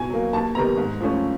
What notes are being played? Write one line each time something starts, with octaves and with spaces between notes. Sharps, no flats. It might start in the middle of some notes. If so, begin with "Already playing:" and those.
Already playing: B2 G#5
F#3 A#3
D#2 A5
D#3 G3 B3 A#5
G#2
F3 A3 C#4